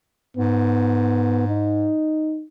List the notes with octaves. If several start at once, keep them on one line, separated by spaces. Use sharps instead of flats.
G#2 B3
D#4